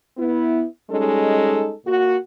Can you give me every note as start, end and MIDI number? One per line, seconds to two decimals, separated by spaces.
0.18 0.63 59
0.18 0.63 64
0.90 1.73 55
0.90 1.73 56
0.90 1.73 61
0.90 1.73 63
0.90 1.73 69
1.86 2.16 46
1.86 2.16 66